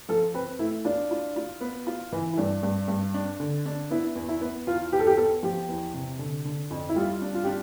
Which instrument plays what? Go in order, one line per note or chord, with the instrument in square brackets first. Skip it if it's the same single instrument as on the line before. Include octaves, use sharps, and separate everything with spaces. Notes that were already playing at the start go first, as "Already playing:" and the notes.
[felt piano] F3 [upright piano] A4
[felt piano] C4 [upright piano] B4
[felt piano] A3 [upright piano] E4
[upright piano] D4 [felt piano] F4
[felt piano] F4
F4
B3
F4
E3
[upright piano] E4
[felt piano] G2 [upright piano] D4
[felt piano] G2
G2
D4
D3
D4
[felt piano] B3 [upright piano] E4
[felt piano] E2
[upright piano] E4
[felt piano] B3
[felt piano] E2 [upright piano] F4
[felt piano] E2 [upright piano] G4
[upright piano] A4
G4
[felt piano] B3 [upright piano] A4
[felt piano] F3 [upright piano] G4
[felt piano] E2
C3
D3
D3
F2
[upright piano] E4
[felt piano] G3 [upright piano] F4
[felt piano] D4
[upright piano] F4
[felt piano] D4 [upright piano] G4